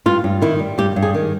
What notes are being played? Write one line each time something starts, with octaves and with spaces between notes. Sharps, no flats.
G2 F4
G2
D#3 E4
G3
G2 G4
G2
G#4
D#3